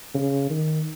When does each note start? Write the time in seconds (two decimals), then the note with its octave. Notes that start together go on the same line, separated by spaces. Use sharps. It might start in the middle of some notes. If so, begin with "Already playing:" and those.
0.15 C#3
0.50 D#3